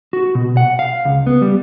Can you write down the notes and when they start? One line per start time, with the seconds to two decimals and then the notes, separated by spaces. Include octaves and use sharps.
0.13 F#4
0.35 B2
0.57 F#5
0.79 F5
1.05 C#2
1.27 B3
1.41 G3